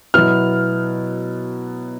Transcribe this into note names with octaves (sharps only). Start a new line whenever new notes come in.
B2 F#3 B3 E4 F6